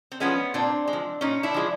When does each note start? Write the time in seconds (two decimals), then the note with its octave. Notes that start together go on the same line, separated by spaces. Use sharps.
0.12 C4
0.20 F3 G#3 B3 C#4
0.54 A#2 C4 D4
0.88 G#3
0.93 F3
1.21 A#2 C#4 D#4
1.43 D4 E4
1.54 F3 G#3